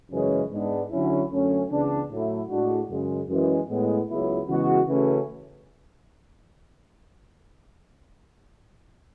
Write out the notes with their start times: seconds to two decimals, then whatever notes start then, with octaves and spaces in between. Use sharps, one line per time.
0.11 F#2 C#3 E3 G#3 C#4
0.51 G#2 G#3 B3 D4
0.91 D3 F#3 C#4 E4
1.31 F#2 D3 F#3 A3 C#4
1.70 C#2 C#3 E3 B3 D4
2.10 A2 F#3 A3 E4
2.49 A2 G#3 D4 F#4
2.90 F#2 C#3 G#3
3.28 F#2 E3 G#3
3.68 A2 G#3 B3
4.08 C#2 C#3 F#3 B3 E4
4.47 C#3 E3 G#3 B3 F#4
4.87 C#3 E3 A3 C#4 F#4